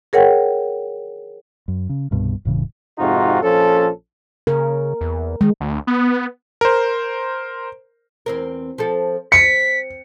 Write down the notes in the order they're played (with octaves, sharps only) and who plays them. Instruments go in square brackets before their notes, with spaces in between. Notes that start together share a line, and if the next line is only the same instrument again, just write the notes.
[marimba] G#4 A#4 C#5 F#5 G5
[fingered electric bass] F#2
C#3
C2 G2 B2
E1 A2 C#3 E3
[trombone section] F2 G#2 C3 D#4 F4 F#4
A#1 F3 C#4 A4
[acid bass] C#3 [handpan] A#4
[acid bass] E2
[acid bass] D#3 [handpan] G#3
[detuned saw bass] D2
B3
[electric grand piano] A#4 C5
[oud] E2 C4 A#4
F3 C4 A4
[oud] C4 [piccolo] B6 [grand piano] C#7